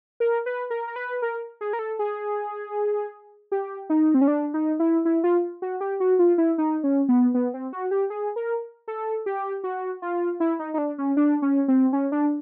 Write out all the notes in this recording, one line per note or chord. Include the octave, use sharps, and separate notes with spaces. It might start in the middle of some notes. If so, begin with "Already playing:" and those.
A#4
B4
A#4
A#4
B4
A#4
G#4
A#4
A4
G#4
G4
D#4
C4
C#4
D4
D#4
E4
E4
F4
F#4
G4
F#4
F4
E4
D#4
C#4
B3
B3
C4
F#4
G4
G#4
A#4
A4
G4
F#4
F4
E4
D#4
D#4
D4
C#4
D4
C#4
C4
C#4
D4